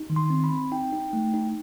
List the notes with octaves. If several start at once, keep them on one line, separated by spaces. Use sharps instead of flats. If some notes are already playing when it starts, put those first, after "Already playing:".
Already playing: D#4
D#3
C6
C4
B5
C4
D#4 G5
D#4
A3
D#4